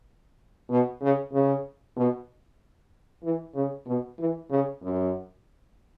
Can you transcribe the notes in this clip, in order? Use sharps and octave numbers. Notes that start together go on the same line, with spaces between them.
B2
C#3
C#3
B2
E3
C#3
B2
E3
C#3
F#2